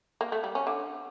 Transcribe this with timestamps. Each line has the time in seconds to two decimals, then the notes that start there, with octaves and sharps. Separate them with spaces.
0.21 A#3
0.32 A3
0.44 G3
0.55 C#4
0.67 D3